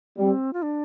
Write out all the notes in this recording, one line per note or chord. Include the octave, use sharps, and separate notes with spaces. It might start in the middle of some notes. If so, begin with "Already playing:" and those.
G3 C4
F4
D4